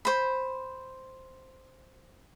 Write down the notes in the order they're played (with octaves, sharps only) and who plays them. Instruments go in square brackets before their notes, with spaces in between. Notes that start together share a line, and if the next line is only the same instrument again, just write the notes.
[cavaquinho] C5 B5